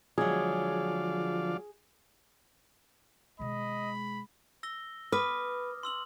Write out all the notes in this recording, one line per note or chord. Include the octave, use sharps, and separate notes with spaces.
D3 F3 F#3 G#3 G#4 D5 F5
B2 D#3 G#3 D#5 B5
E6 A#6 G7
B4 D6 D#6 F6
C6 E6 F#7